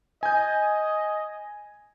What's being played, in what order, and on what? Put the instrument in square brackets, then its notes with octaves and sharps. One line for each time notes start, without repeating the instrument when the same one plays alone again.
[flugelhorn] D#5 [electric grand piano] G#5 G6